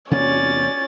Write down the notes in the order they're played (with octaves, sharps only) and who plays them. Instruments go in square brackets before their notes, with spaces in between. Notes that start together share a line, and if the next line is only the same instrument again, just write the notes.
[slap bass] E2 C3 A#3 [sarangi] C#4 [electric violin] D5 A6